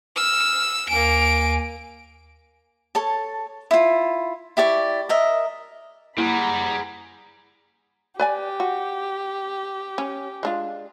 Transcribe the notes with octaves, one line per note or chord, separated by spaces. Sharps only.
E6 F6
D#2 A#3 G#5 D7
A4 C#5 A5
E4 F4
E4 G4 D5 C#6
A#4 D#5 E5
G3 A#3 E4 G#4 F#5 A#5 B5
G4 B4 D5 G#5
F#4
C#4
G#3 D4 F4